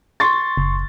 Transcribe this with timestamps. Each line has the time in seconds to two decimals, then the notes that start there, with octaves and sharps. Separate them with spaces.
0.20 C6 C#6 A6
0.57 F#1